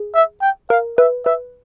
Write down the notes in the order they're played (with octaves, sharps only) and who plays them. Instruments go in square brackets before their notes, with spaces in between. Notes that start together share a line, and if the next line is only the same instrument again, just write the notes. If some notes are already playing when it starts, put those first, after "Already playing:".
Already playing: [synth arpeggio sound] G#4
[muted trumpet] E5
G5
[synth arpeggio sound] A#4 [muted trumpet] F5
[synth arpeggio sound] B4 [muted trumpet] E5
[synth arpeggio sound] B4 [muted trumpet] E5